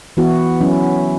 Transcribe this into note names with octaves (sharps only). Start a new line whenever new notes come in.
E3 B3 E4 F#4
F#3 C#4 E4